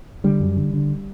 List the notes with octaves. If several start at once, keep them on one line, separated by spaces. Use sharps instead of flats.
D3 G3
F#2
D3
D3